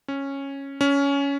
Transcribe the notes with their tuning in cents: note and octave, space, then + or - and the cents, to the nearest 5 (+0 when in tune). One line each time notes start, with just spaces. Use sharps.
C#4 -10
C#4 +15